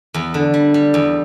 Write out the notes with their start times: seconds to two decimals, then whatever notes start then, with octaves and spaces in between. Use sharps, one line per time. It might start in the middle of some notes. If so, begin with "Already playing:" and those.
0.14 E2
0.34 D3
0.54 G3
0.74 G3
0.94 E2